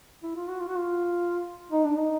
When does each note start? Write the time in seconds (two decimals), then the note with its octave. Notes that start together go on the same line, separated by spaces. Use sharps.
0.23 E4
0.36 F4
0.48 F#4
0.60 F4
0.68 F#4
0.77 F4
1.71 D#4
1.84 D4
1.96 D#4